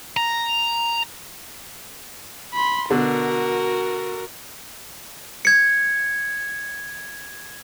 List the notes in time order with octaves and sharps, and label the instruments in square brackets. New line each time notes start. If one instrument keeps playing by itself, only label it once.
[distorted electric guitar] A#5
[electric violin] B5 C6
[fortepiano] B2 D3 [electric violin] F#4 A#4
[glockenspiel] G#6 C#7